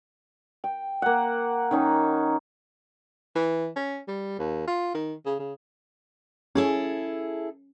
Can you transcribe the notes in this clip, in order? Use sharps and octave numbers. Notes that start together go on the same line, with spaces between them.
G5
A#3 F#5
D#3 C#4 D#4
E3
C#4
G3
D#2
F4
D#3
C#3
C#3
C#4 E4 G#4 A4